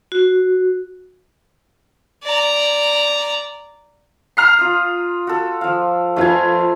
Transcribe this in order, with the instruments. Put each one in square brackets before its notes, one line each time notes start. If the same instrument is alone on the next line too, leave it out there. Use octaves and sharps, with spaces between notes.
[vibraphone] F#4
[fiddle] D5 A#5
[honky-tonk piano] A#5 F6 C7
[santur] F4 D#6
F#4 A4
F3 F5
[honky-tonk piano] F2 F4 B4 [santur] A3 C5 G#5